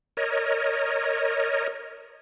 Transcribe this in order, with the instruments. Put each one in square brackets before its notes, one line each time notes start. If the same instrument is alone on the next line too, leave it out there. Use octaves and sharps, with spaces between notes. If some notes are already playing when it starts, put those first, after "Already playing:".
[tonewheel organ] A#4 C#5 D#5